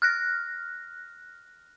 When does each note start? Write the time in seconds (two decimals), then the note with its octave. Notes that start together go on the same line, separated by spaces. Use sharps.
0.02 F6 F#6 A#6